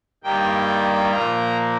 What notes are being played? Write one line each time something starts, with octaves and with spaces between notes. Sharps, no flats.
G2 D#3 G3 A#3 G5
A#2 F3 A#3 A#5